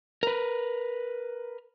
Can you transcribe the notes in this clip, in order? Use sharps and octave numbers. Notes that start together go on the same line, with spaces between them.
A#4 B4